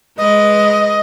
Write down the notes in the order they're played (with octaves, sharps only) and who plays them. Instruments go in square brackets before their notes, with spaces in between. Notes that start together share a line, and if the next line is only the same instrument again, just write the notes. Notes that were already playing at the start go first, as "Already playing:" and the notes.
[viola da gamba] G#3 B4 [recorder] D#5